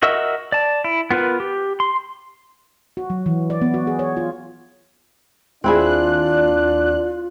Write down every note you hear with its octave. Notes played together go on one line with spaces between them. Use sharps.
F#4 A#4 D#5 E5 E6
D5 A5
E4
B3 F4 A#4 B4
G4
C6
F#4
F#3
E3
D5
B3
F#4
G#4
C#5
F4
D#2 C4 D4 E4 F4 G#4 D5 F#6